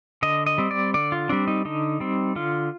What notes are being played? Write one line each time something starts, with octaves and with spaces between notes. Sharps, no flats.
D3 D#5
D#5
G3 C4
D5
D3 D5
F4
G3 C4 D4
D#4
D3 D#4
G3 C4
D3 F4